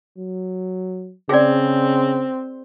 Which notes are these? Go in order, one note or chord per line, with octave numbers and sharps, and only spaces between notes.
F#3
C#3 C4 G#4 D5